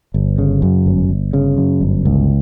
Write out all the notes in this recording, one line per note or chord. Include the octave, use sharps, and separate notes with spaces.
G1
C#3
F#2
G1
G1
C#3
F#2
G1
C#2